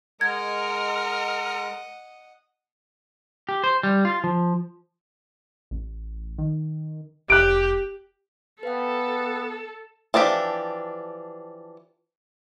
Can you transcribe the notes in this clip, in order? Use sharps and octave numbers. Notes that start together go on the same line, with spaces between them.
G#3 A#4 D#5 F#5 G#6
G4
C5
G3
F4
F3
A1
D#3
F1 G4 F#6 D7
B3 A4 B4 F5 G5
E3 F3 D4 G4